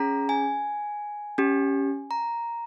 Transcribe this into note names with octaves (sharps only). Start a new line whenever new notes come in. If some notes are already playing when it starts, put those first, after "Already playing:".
Already playing: C#4 G#4 A#5
G#5
C#4 G4
A#5